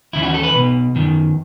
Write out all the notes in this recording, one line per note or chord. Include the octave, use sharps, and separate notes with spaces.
D#2 C#3 E3 E4
F#4
A4
B4
B1 B2
F#2 D#3